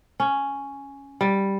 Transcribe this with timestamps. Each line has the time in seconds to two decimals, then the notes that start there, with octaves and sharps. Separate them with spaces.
0.20 C#4
1.21 G3